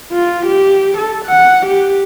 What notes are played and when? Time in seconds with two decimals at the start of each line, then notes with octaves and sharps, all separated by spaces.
0.12 F4
0.46 G4
0.97 A4
1.26 F#5
1.66 G4